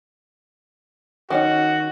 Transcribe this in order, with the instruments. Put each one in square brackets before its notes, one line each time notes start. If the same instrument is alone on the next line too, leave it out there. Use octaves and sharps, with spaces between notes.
[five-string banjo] D#3 C#4 D#4 [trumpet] F#4